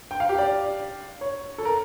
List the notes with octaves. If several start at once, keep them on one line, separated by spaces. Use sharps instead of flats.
G5
F5
G4
D5
C#5
A4
A#4